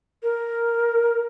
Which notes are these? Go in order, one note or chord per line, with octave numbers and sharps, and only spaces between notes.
A#4